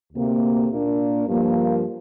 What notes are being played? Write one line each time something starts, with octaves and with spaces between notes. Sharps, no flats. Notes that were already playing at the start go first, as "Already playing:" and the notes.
D2 C3 A#3
A#2 A#3 D4
G2 F3 A#3